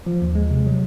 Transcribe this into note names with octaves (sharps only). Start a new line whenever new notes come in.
F3
D#2
G#3
C3
F#3